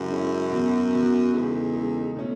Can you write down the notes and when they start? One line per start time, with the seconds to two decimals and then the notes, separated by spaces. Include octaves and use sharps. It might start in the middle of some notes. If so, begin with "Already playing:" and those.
Already playing: F#2 C#3 G#3 C#4 E4
0.11 C#3 G#3 C#4 E4
0.51 E2 B2 F#3
0.93 E2 B2 F#3
1.33 E2 C#3 G#3 D#4 A4
1.74 C#3 G#3 D#4 A4
2.16 B2 A3 C#4